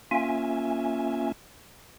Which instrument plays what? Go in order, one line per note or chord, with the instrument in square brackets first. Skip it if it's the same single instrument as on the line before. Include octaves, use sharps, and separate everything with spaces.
[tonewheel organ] A#3 C#4 F4 E5 G#5